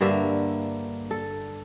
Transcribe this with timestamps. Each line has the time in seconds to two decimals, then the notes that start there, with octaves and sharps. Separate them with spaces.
0.01 G2 D3 A#3 E5
1.11 A4